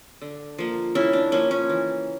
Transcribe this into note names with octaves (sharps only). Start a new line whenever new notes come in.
D3
F3 A#3
C#3 C#4 E4
D4
F3 A#3 C#4
C#4
E3